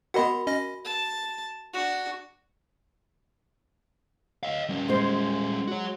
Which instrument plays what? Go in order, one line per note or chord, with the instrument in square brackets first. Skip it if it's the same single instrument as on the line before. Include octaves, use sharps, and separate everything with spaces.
[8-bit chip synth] B3 D#5 F#5 [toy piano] F#4 A#4 B5
[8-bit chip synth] C#4 D#5 A#6
[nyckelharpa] A5
D4 F#4
[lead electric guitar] D#5 F5
G3 C#4
[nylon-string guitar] G#3 C5
[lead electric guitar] F#4 C#5